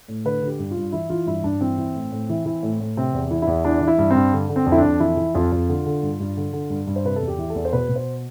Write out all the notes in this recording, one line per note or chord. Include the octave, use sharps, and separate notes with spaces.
A2
D3 B4
D3
G4
G2
F4
G2
E3 E4
E3 F4
G2 E4
G2 D4
E3 C4
E3
A2
A2
E3
E3
A2
A2
C3 C4
E2
E3
E2 E4
E3 D4
E3
E4
G2
G2 C4
D3
D3
C4
F2
E4
D4
F2
E3 E4
E3
F2 F4
F2
D3
D3
G2
G2
D3
D3
G2
G2
C5
C3 B4
A4
E2
G4
E3
A4
E2
C5
B2 B4
B2
C5